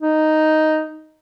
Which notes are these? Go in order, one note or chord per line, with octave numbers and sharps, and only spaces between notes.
D#4